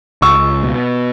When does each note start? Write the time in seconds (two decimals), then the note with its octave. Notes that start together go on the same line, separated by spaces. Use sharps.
0.22 C#2 C#6 E6
0.63 B2